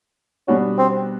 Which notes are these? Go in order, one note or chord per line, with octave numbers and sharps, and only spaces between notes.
B2 G3 B3 C#4 D4 F#4
C4